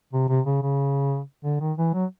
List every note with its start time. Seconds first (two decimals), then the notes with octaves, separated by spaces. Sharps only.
0.13 C3
0.29 C3
0.46 C#3
0.62 C#3
1.44 D3
1.61 D#3
1.78 E3
1.94 F#3